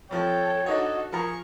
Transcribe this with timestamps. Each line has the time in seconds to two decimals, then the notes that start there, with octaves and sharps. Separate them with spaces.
0.11 F2 F3 A4 C#5 G5
0.66 D4 D#4 F#4 A4 C#5 D#5
1.12 F3 G#4 A#4 A#5 C#6